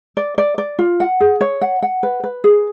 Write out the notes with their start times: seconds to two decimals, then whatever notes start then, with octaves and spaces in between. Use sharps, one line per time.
0.17 D5
0.38 D5
0.58 D5
0.79 F4
1.00 F#5
1.20 G#4
1.41 C#5
1.61 F#5
1.82 F#5
2.03 B4
2.24 B4
2.44 G#4